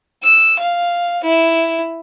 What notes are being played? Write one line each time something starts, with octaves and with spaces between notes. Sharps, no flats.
E6
F5
E4